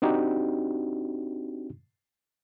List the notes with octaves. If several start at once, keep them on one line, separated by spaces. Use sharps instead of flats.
C4 D4 D#4 F#4 G4